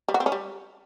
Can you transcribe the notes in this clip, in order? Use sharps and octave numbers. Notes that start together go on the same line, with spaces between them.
G3
F#4
C4
C#4
G3